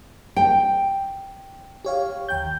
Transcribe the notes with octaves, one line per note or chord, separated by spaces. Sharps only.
G5
G4 C#5 F5
D#2 G5 G6